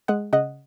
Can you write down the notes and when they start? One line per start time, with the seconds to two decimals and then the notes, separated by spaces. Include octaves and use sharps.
0.08 G#3 D#5 F#5
0.33 C#3 D#5 F#5